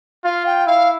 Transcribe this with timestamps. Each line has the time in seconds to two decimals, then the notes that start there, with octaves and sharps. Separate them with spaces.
0.24 F4 F5
0.46 G5
0.66 E4 F5